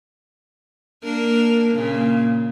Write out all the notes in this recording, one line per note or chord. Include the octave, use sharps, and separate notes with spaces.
A#3 D4 A#4
A#2 C#3